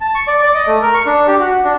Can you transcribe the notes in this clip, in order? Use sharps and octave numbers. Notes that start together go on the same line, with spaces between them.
A5
C#6
D5
D5
D#5
A3
A#4
C#6
D4
G4
F#4
D4